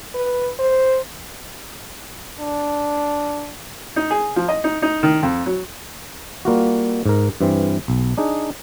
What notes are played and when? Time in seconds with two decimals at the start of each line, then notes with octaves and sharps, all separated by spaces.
0.14 B4
0.59 C5
2.40 D4
3.96 D#4
4.11 G#4
4.36 F3
4.48 D#5
4.64 D#4
4.82 D#4
5.03 D#3
5.23 F2
5.46 F#3
6.45 G3 A#3 F4 F#4
7.06 G#2 A#4
7.41 G2 E3 C4
7.88 B1
8.17 D4 D#4 G#4